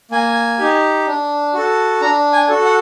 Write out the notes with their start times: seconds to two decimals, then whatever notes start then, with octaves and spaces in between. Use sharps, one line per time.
0.11 A#3 G#5
0.59 D#4 G4
1.07 D4
1.54 F#4 A4
2.01 D4 A#5
2.33 G#5
2.49 F#4 A4
2.65 F#5